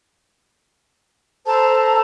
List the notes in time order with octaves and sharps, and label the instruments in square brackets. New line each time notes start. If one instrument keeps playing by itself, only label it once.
[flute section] A4 C5 A5 A#5